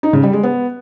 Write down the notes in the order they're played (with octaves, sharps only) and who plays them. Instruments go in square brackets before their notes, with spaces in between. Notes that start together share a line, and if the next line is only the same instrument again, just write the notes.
[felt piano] D#4
C#3
G3
G#3
B3